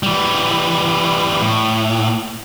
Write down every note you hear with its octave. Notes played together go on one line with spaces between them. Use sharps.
E3 G3
A2